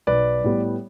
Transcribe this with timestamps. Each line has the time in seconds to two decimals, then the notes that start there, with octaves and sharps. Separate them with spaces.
0.07 B1 B4 D5
0.44 A2 G3 B3